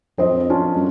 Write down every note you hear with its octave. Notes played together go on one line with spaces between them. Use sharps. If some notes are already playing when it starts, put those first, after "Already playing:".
F2 C4 C5 D#5
C#4 D4 F4
F#2